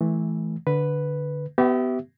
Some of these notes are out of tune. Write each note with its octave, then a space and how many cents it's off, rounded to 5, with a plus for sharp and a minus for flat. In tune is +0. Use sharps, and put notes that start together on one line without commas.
E3 -5 A3 -25
D3 +0 B4 +0
B3 +20 G4 -30 E5 +0